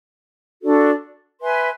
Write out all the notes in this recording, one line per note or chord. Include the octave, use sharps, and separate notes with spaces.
D4 F#4 A4 D5
B4 E5 G#5 C6